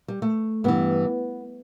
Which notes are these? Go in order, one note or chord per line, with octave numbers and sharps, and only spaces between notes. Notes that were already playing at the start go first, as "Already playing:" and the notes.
G3
A3
G2 E3 B3